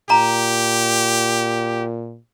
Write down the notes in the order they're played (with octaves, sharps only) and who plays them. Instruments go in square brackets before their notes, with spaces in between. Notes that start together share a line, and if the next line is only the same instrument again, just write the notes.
[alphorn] A#2 [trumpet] G4 [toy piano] A#5